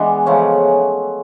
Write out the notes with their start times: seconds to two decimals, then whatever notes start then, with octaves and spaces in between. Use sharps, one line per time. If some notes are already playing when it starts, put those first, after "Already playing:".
Already playing: E3 G#3 B3 D4
0.26 C#3 F3 A3 C#4